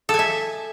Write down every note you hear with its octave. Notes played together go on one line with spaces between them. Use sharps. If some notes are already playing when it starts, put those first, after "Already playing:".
A4
G#5
E5